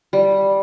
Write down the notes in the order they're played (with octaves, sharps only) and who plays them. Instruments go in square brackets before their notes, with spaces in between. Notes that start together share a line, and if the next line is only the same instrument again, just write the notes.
[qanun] G3